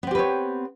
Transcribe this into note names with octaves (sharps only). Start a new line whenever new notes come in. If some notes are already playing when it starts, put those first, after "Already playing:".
B3 C4 G4 B4 C#5